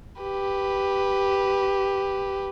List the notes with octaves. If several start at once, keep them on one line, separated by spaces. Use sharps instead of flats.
G4 B4